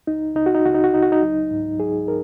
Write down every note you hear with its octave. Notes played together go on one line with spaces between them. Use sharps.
C#2 D#4
C#2 D#4
F#4
D#4
C#2 F#4
D#4
F#4
C#2 D#4
F#4
D#4
F#3
G#2
F#3 G#4
A#4